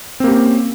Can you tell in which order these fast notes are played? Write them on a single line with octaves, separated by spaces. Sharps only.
C4 A#3 G4 C#4